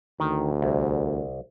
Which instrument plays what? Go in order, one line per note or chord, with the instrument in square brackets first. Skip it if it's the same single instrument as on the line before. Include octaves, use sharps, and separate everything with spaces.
[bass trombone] D2 [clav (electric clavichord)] D#3
[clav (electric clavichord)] C2